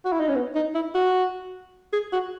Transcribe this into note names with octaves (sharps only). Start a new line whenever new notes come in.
F#4
E4
D#4
C#4
B3
D#4
E4
F#4
G#4
F#4